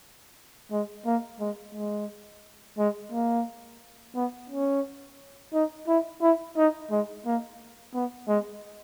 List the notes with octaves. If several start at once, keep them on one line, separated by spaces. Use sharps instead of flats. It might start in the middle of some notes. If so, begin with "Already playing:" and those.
G#3
A#3
G#3
G#3
G#3
A#3
B3
C#4
D#4
E4
E4
D#4
G#3
A#3
B3
G#3